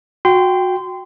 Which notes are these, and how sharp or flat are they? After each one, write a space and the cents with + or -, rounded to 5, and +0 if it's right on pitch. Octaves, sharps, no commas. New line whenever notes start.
F#4 -20 G5 +0 C6 -25